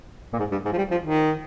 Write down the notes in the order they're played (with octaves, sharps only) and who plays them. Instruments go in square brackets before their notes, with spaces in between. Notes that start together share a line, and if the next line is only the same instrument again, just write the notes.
[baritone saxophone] A#2
G#2
G2
G#2
F3
G3
F3
D#3